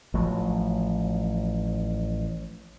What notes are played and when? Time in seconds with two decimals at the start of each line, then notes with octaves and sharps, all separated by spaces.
0.14 A1 F3 F#3 A3